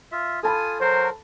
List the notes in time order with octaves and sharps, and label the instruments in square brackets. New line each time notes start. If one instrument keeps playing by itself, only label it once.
[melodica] F4 E5
[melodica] F4 G#5 D#6 [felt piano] A4 A5 B5
[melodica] F#3 F#4 A#4 [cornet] C5